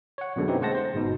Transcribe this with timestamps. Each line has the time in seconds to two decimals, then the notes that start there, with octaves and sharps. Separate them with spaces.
0.18 C#5 F#5
0.36 F#2 B2 D3 G#3
0.48 C4 C#4 D#4 E4 G4 B4
0.61 G#3 A3 C5 F#5 A5 A#6
0.75 C5
0.94 G1 G#2 B2 D#4